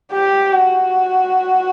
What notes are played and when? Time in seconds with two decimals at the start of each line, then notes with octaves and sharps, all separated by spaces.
0.12 G4
0.53 F#4